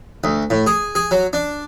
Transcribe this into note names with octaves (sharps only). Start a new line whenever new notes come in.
D2
A2
G#4
G#4
F#3
D4